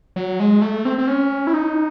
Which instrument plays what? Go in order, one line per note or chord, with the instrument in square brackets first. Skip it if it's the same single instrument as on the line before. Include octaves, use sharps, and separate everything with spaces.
[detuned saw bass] F#3
G#3
A3
C4
C4
C#4
E4
D#4